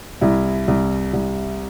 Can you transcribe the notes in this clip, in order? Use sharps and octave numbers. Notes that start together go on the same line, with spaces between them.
C2 E4
C2
C2